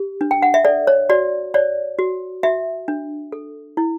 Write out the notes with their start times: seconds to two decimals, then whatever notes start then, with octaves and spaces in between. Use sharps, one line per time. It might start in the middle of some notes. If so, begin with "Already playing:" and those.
Already playing: G4
0.21 D4
0.31 G5
0.42 F#5
0.54 E5
0.65 A4 D5
0.87 C#5
1.09 F#4 D5
1.54 C#5 D5
1.99 F#4
2.43 F#4 E5
2.88 D4
3.32 A4
3.77 E4